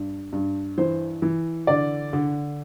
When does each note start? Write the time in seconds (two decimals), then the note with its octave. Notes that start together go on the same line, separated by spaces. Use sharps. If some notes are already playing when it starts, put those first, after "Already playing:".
Already playing: G2
0.33 G2
0.78 E3 C5
1.22 E3
1.67 D3 D5
2.13 D3